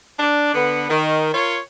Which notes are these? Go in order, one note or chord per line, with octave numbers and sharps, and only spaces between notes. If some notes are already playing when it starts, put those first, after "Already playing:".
D4
D3 B3
D#3
F4 A#4 C#5